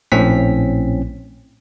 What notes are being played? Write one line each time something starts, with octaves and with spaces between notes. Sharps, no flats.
A#1 A2 C4 C#4 B6